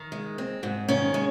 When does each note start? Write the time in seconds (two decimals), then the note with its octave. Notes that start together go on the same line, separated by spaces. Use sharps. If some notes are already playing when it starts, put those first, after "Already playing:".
Already playing: D#3
0.12 G#3
0.38 C4
0.63 G#2
0.88 D#3 C#4
1.14 G#3